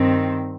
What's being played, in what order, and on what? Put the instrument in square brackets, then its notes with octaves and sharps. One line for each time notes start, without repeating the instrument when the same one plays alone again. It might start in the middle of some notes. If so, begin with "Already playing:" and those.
Already playing: [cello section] G2 D#3 C4